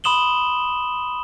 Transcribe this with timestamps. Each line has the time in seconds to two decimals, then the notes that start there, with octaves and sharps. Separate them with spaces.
0.04 B5 C6 D#6 E7 F#7 G7